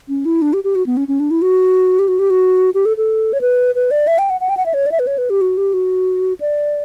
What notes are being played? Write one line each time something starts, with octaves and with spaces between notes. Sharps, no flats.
C#4
E4
D4
G4
G4
F#4
B3
C#4
C#4
D4
E4
F#4
G4
F#4
G4
F#4
G4
A4
A4
C#5
B4
B4
D5
E5
G5
F#5
F#5
G5
F#5
E5
C#5
D5
E5
B4
C#5
B4
G4
F#4
G4
F#4
D5